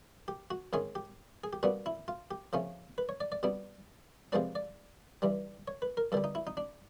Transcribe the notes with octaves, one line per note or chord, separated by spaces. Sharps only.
G4
F#4
G#2 D#3 G#3 C#4 G#4
G4
G#4
G4
A#2 G3 B3 D4 F#4
E4
F4
G4
C#3 F3 A3 C#4
B4
C#5
D5
D5
B2 G3 B3 D4
C3 F3 G#3 B3 D4 D5
D5
G2 E3 G3
C#5
B4
A#4
G2 D3 G3 A4
D#4
E4
D#4
D4